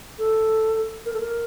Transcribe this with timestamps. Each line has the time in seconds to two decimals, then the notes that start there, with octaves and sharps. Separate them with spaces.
0.19 A4
1.06 A#4
1.14 A4
1.21 A#4